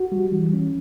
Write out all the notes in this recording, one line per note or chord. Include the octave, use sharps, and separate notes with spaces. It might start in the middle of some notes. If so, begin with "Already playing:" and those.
Already playing: F#4
G3
E3
C#4